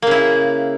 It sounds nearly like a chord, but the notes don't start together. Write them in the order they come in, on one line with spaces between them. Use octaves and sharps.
A#3 C#3 E4